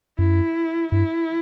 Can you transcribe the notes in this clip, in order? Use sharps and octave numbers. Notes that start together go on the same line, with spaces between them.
F#2 E4
G2 E4